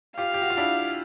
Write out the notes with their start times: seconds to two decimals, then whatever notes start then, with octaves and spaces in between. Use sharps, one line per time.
0.18 F4 G4 F5
0.34 G4
0.42 F#4
0.50 F4
0.57 D4 E4